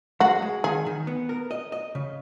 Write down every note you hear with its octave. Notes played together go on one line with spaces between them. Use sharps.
G#3 F#4
G#3
D#3 G#4
D#3
B3
A#4
D#5
D#5
C#3